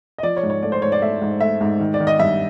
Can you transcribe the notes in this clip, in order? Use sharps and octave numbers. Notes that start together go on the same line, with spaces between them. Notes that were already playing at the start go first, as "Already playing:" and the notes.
D#5
F3 D5
C#5
G#2
C#5
A3 D5
C5
G#2 C#5
D5
A3 E5
G#2
A3 E5
G#2
D#3
D5
D#3
D#5
G2 E5